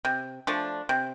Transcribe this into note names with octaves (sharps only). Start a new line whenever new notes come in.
C3
F3 A3 D4
C3